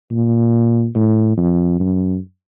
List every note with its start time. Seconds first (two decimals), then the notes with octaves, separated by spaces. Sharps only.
0.11 A#2
0.95 A2
1.37 F2
1.80 F#2